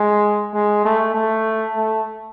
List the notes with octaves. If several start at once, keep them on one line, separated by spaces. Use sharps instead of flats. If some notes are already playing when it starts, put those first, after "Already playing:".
Already playing: G#3
G#3
A3
A3
A3